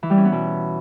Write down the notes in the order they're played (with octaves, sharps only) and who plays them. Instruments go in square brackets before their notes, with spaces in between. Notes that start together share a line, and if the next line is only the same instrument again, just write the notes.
[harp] E3
G3
C#4
B3
B2